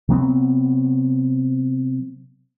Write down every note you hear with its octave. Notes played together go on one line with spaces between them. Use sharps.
C3 F#3 B3 C4